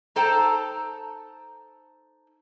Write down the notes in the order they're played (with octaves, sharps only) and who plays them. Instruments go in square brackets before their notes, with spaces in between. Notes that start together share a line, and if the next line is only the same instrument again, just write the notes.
[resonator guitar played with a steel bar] D#4 A4 C5 G5 A5 A#5